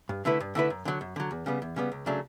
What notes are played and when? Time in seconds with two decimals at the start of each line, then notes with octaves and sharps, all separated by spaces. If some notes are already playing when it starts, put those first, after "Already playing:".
0.09 G2
0.25 D3 A3 E4 B4
0.40 G2
0.55 D3 A3 E4 B4
0.70 F#2
0.85 D3 F#3
1.01 F#2
1.16 D3 F#3
1.31 E2
1.46 C#3 G3 B3
1.62 E2
1.76 C#3 G3 B3
1.92 C#2
2.06 C#3 F#3 A3 D4